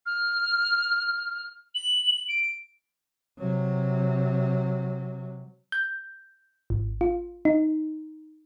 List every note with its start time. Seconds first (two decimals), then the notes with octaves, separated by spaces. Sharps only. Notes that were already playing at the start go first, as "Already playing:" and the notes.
0.06 F6
1.75 F#7
2.29 D7
3.38 C3 F#3
5.72 G6
6.70 G#1
7.01 F4
7.45 D#4